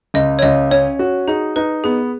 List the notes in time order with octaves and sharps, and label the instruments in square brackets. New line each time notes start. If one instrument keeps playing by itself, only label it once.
[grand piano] C#2 [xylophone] D#5
[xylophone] C#5
[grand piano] C#2 [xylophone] D#5
[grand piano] C#4 [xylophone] C#5
[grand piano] F#4
[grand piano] D#4 [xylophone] G#4
[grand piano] D#4 [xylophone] B4
[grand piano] B3 [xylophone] G#4